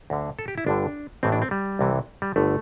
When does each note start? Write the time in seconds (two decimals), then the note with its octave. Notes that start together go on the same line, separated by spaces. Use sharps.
0.10 D2 D3
0.39 A4
0.48 G4
0.58 E4
0.66 G1 G2 D3 D4
1.23 A1 A2 E3 C4
1.32 D4
1.42 C4
1.51 G3
1.79 C2 C3 E3
2.22 G3
2.36 G1 D3 A3